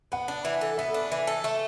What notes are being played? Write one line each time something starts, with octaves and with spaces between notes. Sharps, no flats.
B3 F#5
D4
E3
A4
B3 E5
D4
E3
A4
A3